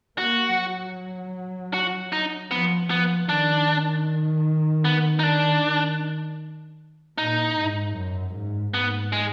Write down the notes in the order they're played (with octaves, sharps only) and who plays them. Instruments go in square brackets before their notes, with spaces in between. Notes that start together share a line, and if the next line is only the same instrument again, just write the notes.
[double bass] A#3 [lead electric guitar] F#4
[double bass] F#3
[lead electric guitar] F#4
D#4
[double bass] F3 [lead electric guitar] B3
[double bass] F3 [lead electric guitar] B3
[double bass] D#3 [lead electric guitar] D4
[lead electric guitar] B3
D#4
D4
[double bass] D#3
[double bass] A#2 [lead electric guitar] D#4
[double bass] G#2
F#2
G#2
[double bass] G#2 [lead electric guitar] B3
[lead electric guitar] G#3